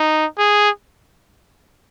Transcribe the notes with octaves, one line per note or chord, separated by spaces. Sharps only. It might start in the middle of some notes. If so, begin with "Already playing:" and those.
Already playing: D#4
G#4